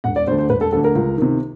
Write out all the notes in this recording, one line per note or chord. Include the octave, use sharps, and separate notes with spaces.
E1 F#5
D5
D2 D3 C5
C5
E1 B4
A4
D2 D3 A4
A#4
C#2
C3 D#3